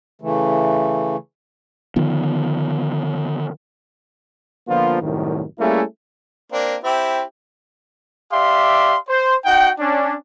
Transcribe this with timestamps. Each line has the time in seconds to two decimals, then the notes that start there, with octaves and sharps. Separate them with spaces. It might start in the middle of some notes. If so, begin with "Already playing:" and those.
0.22 C#3 E3 A3
1.96 D3 D#3 F3 B3
4.68 D3 F3 A#3 B3 F4 C5
5.01 C2 F#2 A2 D#3
5.59 G3 A3 A#3 C#4 E4 G#4
6.52 A#3 C4 D4
6.83 C4 E4 G4
8.32 G4 D5 E5 F5 C6
9.08 C5
9.45 D#4 F#4 F#5 G5
9.79 C#4 D4